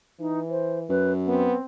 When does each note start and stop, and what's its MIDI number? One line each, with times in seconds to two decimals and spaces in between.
0.20 0.89 52
0.20 0.39 63
0.50 0.79 72
0.89 1.53 42
0.89 1.12 71
1.27 1.57 59
1.27 1.65 60